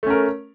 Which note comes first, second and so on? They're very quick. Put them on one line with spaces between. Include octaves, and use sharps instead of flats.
A3 C#4 A#4